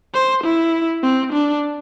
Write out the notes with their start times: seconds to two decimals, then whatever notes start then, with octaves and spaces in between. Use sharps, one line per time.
0.14 C5
0.44 E4
1.03 C4
1.33 D4